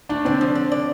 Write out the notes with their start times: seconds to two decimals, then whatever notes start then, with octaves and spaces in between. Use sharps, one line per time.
0.09 A3 D4
0.25 D3 C4
0.41 F3
0.55 D3
0.72 D5